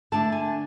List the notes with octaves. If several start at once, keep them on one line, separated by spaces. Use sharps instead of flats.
D3 A3 D4 A5
G#5